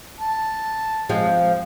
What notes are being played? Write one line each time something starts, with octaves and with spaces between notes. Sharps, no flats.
A5
F3 G#3 C4